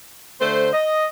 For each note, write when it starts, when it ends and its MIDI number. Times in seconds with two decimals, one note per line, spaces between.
0.41 0.69 50
0.41 0.69 57
0.41 0.69 72
0.73 1.06 75